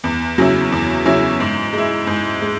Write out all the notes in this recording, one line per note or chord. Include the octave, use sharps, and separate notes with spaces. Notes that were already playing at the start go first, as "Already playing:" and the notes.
E2
C#3 F#3 C#4 E4
E2
C#3 F#3 C#4 E4
G#2
G#3 E4
G#2
G#3